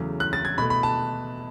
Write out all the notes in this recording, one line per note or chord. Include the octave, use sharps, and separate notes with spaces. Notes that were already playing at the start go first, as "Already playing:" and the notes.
Already playing: E2 C#3 F#3 A3
F#6
A6
G#6
B2 A3 B5
B5
A5